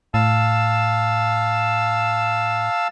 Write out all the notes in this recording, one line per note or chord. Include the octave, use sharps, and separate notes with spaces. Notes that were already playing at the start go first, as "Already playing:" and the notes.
A2 F5 A5 E6